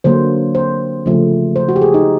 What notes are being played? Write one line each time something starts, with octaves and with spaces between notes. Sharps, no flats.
D3 F#3 A#3 C5
C5
C#3 F3 A3
C5
F#4
G4
G#4
D#4